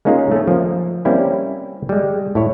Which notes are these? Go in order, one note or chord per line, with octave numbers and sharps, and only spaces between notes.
G#3 A#3 C#4 D#4 F4 G#4
A3 C#4
F3 A#3
G3 A#3 C4 C#4 E4
G3 G#3
A2 E4 C#5